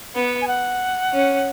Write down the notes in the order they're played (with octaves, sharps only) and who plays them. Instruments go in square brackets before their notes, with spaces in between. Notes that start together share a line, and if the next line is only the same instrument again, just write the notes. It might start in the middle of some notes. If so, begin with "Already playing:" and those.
[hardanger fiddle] B3
[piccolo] G#5
F#5
[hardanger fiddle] C#4